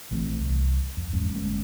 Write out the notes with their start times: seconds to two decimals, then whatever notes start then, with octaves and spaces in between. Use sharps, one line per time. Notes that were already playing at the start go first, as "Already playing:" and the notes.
0.11 A#1 E3 A3 C4
0.40 C2
0.97 F2
1.13 E2 G#2 F#3 C#4
1.34 G1 G#3 A#3 C#4